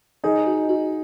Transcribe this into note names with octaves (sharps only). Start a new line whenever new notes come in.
D#4 G#4 D#5
F#4
F#4